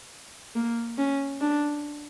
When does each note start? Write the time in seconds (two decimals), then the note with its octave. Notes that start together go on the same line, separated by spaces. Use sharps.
0.55 A#3
0.98 C#4
1.41 D4